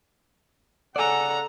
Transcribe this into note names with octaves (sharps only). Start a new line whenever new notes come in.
C#3 A4 D5 F#5 G#5 A#5